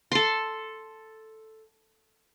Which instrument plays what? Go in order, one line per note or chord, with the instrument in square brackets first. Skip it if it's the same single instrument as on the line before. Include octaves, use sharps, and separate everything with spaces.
[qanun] A4 C6